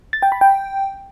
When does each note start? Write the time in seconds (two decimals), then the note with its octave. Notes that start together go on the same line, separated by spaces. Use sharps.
0.13 A6
0.22 G5
0.32 B5
0.41 G5